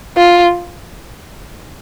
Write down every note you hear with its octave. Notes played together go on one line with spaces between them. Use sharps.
F4